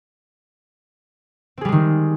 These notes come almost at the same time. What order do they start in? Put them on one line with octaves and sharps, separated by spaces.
C4 G#4 G3 G#3 D#3